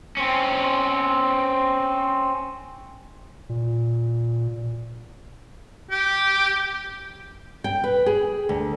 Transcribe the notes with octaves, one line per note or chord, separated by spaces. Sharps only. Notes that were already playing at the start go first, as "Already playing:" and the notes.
C4 C#4
A#2
G4
G5
B4
G#4
D2